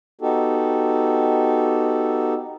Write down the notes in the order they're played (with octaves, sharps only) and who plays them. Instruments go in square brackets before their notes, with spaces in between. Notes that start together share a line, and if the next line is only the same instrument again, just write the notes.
[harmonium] B3 D#4 F#4 G4 A4